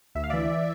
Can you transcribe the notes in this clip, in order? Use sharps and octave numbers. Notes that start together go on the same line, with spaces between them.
D2 E5
F5
E3 D5 E5